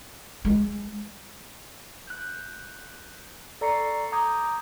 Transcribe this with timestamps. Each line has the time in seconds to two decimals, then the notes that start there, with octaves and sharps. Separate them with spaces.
0.45 G#3
2.07 F#6 G6
3.61 A4 D5 A#5 C#6 C7 C#7
4.12 A#5 D6 D#6 G6 G#6